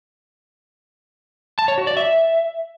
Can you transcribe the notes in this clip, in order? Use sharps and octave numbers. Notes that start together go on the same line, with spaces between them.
A5
C#5
F#4
D5
E5